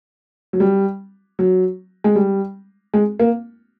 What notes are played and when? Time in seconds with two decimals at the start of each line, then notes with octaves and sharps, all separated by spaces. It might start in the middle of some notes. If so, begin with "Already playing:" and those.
0.53 F#3
0.60 G3
1.39 F#3
2.04 G#3
2.16 G3
2.94 G#3
3.19 A#3